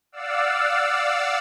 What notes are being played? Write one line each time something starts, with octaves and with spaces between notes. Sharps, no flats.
D5 F5 F#5 E6